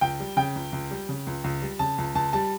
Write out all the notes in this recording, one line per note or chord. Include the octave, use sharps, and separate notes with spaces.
C#2 G5
G3
C#3 G5
C#2
C#2
G3
C#3
C#2
C#2
G3
C#3 A5
C#2
C#2 A5
G3 A5